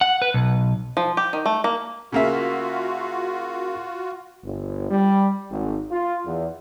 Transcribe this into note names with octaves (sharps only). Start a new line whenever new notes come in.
F#5
B4
B1
F3
G4
D#3
A3
A#3
C#3 A#3 F4 F#4 E5
G1
G3
G#1
F4
E2